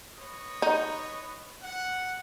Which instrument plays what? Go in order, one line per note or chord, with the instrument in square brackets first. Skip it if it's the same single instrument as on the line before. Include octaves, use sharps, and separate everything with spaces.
[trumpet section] B4 C#5 D#5
[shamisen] D#4
[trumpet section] F#5